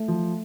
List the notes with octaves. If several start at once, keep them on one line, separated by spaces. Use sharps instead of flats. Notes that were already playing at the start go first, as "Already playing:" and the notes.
Already playing: A3
F3